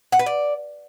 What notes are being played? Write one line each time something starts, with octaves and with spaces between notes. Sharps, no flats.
F#5
B4
D5